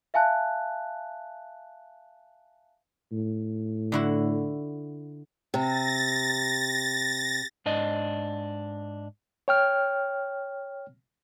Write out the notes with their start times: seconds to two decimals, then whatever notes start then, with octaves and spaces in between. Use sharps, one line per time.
0.14 E5 F5 G#5 A5 F#6
3.12 A2
3.92 D3 E4 F#4
5.54 C3 A6 A#6
7.66 G#2 D4 D#5
9.48 C#5 G5 F6